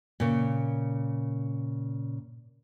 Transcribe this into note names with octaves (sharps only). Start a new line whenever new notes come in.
A#2 C#3